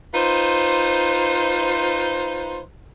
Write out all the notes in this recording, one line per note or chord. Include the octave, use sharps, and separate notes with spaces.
D#4 F4 B4 C5